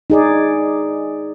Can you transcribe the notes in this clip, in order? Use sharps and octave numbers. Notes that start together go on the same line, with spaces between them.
D#4 G#4 D5